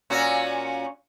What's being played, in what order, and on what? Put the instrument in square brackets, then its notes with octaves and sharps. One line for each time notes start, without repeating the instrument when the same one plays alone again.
[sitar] A#2 C#4 F#4